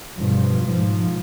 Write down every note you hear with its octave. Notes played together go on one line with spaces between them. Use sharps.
G2 B2 F3
G#2 F3